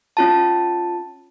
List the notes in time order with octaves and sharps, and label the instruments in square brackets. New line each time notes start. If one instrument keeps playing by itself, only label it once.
[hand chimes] C#4 F4 A5